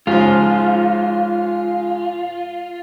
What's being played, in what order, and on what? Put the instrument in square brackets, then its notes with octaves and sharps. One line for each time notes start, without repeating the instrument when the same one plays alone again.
[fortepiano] G#2 C#3 F3 [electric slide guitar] F4